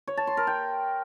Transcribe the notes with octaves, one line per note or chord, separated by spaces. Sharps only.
C#5
A5
C6
A#4
G5